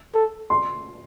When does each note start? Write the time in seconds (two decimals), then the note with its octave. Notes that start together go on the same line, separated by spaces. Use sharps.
0.14 A4
0.50 C6